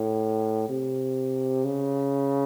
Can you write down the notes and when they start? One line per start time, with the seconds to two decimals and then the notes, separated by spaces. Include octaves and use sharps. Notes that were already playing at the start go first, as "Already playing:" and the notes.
Already playing: A2
0.69 C3
1.65 C#3